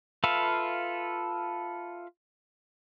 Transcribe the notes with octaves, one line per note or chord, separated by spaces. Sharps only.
F4 A4 B4 E5 F5